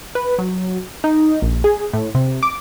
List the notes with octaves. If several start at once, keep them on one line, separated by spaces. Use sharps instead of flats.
B4
F#3
D#4
A#1
G#4
A2
C3
D6